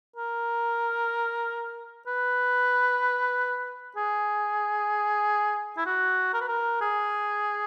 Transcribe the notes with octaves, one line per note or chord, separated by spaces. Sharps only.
A#4
B4
G#4
E4
F#4
A#4
B4
A#4
G#4